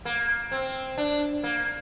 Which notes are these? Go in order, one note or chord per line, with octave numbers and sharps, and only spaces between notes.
A#3
C4
D4
A#3